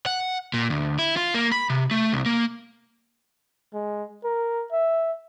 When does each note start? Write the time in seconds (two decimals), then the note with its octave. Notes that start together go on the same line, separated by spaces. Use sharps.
0.06 F#5
0.54 A#2
0.70 D2
0.99 E4
1.17 F4
1.34 A#3
1.52 B5
1.70 C3
1.91 A3
2.13 C2
2.26 A#3
3.74 G#3
4.24 A#4
4.72 E5